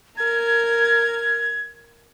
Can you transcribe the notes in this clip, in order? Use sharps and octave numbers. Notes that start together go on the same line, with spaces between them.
A#4 G#6